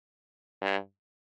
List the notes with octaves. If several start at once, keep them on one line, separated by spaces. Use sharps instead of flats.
G2